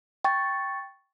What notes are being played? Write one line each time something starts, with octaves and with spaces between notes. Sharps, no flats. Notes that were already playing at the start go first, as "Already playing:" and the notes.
G5 C#6 A6